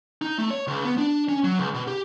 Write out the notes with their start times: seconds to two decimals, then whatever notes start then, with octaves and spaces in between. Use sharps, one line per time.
0.22 D#4
0.38 A3
0.51 C#5
0.67 C#2
0.85 B3
0.98 D4
1.29 C#4
1.44 F#3
1.58 C#2
1.74 B2
1.87 G4